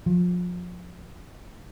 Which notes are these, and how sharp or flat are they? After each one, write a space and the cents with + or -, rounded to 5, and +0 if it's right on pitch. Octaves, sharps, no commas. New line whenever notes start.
F3 +30